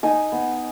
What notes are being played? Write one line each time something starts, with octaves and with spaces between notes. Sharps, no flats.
D#4 G#5
B3